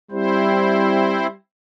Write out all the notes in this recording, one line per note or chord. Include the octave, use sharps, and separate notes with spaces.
G3 C4 E4 C5